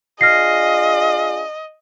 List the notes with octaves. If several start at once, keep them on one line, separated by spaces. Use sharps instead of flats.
D4 F4 G#4 D#5 F6 A#6 C7